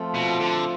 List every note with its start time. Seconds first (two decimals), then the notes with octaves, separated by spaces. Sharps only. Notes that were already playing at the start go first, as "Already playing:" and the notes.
Already playing: F3 A3 C4 F4 A4
0.16 B2
0.41 D3